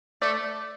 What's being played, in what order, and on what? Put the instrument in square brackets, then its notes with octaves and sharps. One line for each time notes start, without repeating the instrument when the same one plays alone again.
[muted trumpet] A3 [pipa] D5